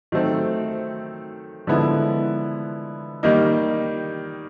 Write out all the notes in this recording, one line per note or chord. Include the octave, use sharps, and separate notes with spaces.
D#3 F#3 A3 C4
D3 F3 G#3 B3 E4
D#3 G3 A#3 D#4